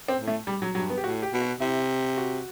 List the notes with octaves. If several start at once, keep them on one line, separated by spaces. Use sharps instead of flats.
C4
A2
A3
G3
F#3
G2 F#3
B3
G4
A2 F#4
G4
B2
F#4
C3 E4
F#4